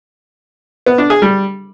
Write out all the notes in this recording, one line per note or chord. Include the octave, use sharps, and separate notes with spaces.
B3
D4
G#4
G3